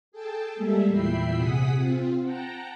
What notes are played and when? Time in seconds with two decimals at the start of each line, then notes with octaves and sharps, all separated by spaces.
0.12 G#4 A4 G5 A5
0.56 G3 G#3 A#3 A4 E5
0.88 E2 A#2 E5 G5 B5 C7
1.35 C3 G#4 F#5 D#6 B6
1.74 C4 F4
2.21 F#5 G5 A5 A#5